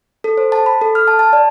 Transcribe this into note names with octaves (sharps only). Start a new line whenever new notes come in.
A4
C5
A5
B5
A4
F6
A5
A5
D5